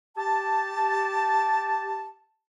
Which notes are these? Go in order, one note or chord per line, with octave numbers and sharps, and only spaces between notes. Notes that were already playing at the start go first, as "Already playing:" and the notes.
G4 A5